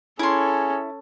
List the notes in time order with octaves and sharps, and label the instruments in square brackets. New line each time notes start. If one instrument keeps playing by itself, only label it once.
[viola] C#4 A4 [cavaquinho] E4 C6 [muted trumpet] G#4